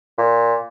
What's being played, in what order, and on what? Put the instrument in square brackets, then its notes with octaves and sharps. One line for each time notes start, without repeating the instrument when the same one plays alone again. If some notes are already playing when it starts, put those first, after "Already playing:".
[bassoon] A#2